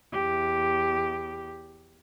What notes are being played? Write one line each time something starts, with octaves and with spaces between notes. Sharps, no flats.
E2 G4